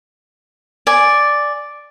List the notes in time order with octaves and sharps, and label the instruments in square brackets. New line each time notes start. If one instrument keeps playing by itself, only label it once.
[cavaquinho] D5 G#5